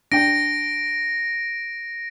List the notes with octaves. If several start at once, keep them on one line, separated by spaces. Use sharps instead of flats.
D4 G5 A#6 D7